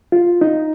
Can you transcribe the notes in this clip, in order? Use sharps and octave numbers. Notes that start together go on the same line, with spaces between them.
F4
D#4